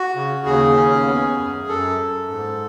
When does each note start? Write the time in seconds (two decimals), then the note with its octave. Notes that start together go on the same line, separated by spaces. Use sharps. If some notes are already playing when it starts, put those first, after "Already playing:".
Already playing: F#4
0.16 C#3
0.46 D#2 G#4
0.76 C#4
1.06 B3
1.37 F#2
1.67 F#2 A4
1.98 F#2
2.29 G#2